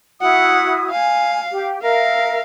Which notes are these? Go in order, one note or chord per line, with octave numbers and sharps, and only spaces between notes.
E4 F#4 F#5 D#6
F5 G#5
G4
A#4 E5 F5